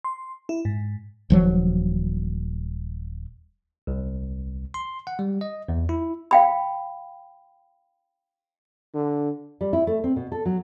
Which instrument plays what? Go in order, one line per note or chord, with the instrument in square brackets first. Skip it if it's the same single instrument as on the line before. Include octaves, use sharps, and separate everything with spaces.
[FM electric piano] C6
E4
G#2
[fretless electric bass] D#1 F3 F#3
[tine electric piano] C2
C6
F#5
G3
D#5
E2
E4
[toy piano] F5 G5 B5
[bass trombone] D3
[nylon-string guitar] G3
E4
A3
C4
B2
A4
F#3